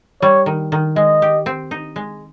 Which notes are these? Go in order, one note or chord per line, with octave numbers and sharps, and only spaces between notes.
G3 C#5
D#3
D#3
G#3 D#5
G4
C4
D#4
G#3